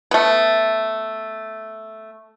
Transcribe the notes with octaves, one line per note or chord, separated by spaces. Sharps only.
A3 B3